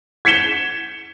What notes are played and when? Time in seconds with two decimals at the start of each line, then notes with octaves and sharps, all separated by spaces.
0.25 G#6 B6 C#7 E7 G7